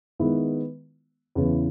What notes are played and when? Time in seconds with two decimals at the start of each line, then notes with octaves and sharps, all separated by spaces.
0.19 D#3 G#3 B3 E4 B4
1.35 E2 C#3 E3